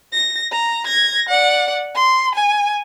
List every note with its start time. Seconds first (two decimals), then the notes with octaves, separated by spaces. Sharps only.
0.12 A#6
0.52 A#5
0.86 G#6 A#6
1.29 D5 F#5
1.95 C6
2.35 G#5